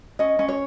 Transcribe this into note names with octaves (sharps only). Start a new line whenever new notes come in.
C#4 D#5
C#4
C#5